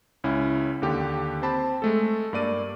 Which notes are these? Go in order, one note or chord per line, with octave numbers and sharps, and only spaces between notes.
C#2 C#4 E4
D#2 D3 G4
C4 C5 A5 B5
G#3 A3 A4
G2 A#3 D5 D#7